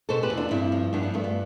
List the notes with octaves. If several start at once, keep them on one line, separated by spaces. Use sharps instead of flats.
B2 A4 C5
G4 B4
E2
D4 F4
G2 C4 E4
F3
G2 B3 D4
B3
G2 A3
B3